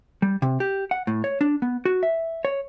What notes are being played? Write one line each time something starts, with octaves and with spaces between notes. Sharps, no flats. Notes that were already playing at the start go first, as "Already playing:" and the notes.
G3
C3
G4
F#5
A2
C#5
D4
B3
F#4
E5
C#5